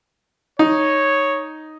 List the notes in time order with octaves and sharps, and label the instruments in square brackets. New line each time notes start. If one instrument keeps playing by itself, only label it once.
[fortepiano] D#4 [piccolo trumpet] C#5